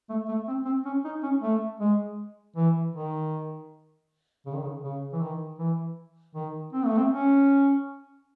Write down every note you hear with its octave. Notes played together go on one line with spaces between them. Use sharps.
A3
A3
C4
C4
C#4
D#4
C#4
A3
G#3
E3
D#3
C#3
D#3
C#3
C#3
E3
D#3
E3
D#3
C4
A3
C4
C#4